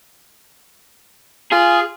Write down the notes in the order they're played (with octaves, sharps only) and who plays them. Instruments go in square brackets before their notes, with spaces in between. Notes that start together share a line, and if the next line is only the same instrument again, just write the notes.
[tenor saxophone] F4 [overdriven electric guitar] G#4